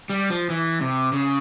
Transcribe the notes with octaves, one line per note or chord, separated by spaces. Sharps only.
G3
F3
E3
C3
C#3